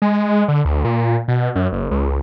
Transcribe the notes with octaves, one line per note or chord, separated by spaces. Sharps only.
G#3
D3
D2
A#2
B2
F#2
F#1
C#2